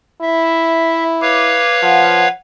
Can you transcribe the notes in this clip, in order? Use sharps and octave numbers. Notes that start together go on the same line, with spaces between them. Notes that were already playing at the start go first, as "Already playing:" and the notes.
E4 E5
B4 C#5 F5 D6
F3 F#5